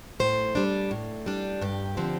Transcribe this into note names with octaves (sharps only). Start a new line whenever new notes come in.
A2 C5
G3 D4
A2
G3 D4
G2 G4
D3 F3 C4